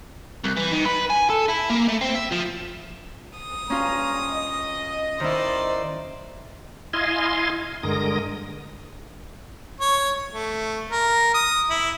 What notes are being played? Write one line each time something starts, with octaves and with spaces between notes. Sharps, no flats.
C2
E3
D#3
B4
G#5
A4
E4
A#3
A3
C4
E5
F3
D#6
G2 C#4 F4 A#5
D#5
D#3 E4 C5 D5
E4 D#5 F5 G#5 C6
G2 D3 G#3 A#4 D#6 A#6
C#5
A3
A#4
D#6
E4